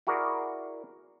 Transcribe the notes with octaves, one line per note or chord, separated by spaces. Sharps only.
E4 F#4 G#4 A#4 D5